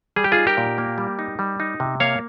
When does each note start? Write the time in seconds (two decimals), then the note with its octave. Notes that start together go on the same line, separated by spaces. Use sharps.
0.16 G3 G#4
0.24 G4
0.32 D#4 F4 G#4
0.47 G4 A#4
0.57 A#2
0.78 A#3
0.98 G3
1.19 D#4
1.39 G3
1.60 D#4
1.80 C3
2.00 A#3 C#5 F5